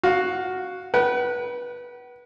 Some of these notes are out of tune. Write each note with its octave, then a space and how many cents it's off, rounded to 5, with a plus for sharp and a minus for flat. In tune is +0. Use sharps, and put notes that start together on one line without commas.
F#4 +0 F5 +15
B4 -25 F#5 +35